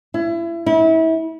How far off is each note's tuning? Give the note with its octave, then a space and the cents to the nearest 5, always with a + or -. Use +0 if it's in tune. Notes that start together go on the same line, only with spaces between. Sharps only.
E4 +30
E4 -30